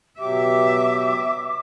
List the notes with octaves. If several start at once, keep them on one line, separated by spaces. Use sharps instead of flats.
B2 F#3 G4 E5 D6